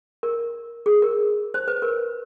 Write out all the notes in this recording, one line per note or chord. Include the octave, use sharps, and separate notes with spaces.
A#4
G#4
A#4
C5
B4
A#4